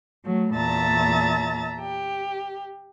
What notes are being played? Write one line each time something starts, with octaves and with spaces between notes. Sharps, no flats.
F#3 A3
E2 A#2 E5 A5 A#5 A6
G4